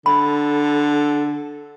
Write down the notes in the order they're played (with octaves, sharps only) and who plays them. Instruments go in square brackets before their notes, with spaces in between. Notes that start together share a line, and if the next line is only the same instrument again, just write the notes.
[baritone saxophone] D3 [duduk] A4 [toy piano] B5